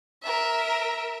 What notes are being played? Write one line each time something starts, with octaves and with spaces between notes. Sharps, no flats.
A#4 E5